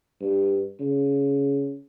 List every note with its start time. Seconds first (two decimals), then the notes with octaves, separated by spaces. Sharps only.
0.21 G2
0.80 C#3